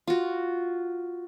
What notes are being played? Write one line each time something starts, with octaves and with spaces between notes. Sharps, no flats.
F4 F#4